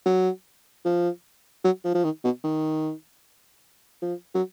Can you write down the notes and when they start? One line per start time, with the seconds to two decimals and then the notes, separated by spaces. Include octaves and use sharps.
0.05 F#3
0.85 F3
1.64 F#3
1.84 F3
1.94 F3
2.04 D#3
2.24 B2
2.44 D#3
4.02 F3
4.34 F#3